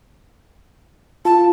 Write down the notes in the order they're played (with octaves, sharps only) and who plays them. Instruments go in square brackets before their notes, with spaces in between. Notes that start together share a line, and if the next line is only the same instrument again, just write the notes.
[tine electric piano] F4 [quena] A5